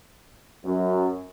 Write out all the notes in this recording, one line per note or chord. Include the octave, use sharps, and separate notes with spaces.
F#2